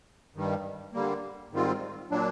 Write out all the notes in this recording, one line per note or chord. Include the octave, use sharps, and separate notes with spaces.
G2 D#3 G3
D3 G3 A#3
G#2 D#3 G3 C4 F4
A#2 F#3 A#3 D4